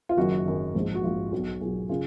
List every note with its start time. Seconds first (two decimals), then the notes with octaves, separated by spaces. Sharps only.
0.09 F4
0.17 F#1 F#2 D#3 F#4
0.46 F#1 F#2 D#3
0.74 A#1 G#2 F3
0.95 F#4
1.03 A#1 G#2 F3 F4
1.32 B1 B2 F#3 F#4
1.61 B1 B2 F#3 F4 G#4
1.89 C#3 F4 G#4